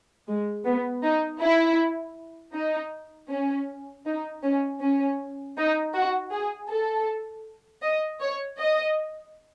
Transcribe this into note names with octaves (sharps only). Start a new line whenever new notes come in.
G#3
B3
D#4
E4
D#4
C#4
D#4
C#4
C#4
D#4
F#4
G#4
A4
D#5
C#5
D#5